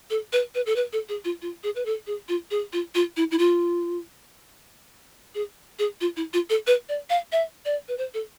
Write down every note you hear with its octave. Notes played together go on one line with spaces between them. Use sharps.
A4
B4
B4
A4
B4
A4
G#4
F4
F4
G#4
B4
A4
G#4
F4
G#4
F4
F4
E4
E4
F4
G#4
G#4
F4
E4
F4
A4
B4
D5
F5
E5
D5
B4
C5
A4